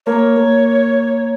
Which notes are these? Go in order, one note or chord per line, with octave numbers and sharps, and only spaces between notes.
A#3 C#5
A#3